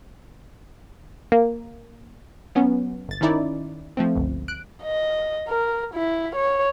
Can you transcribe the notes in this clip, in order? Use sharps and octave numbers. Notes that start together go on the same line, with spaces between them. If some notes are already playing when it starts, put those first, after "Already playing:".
A#3
F#3 B3 C#4
G1 A6
D#3 C#4 D#4 E4 D5
F3 A3 C4
G1 C#2
F#6 D7
D#5
A#4
E4
C#5